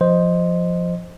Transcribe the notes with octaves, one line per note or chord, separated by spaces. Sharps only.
F3 C5 D#5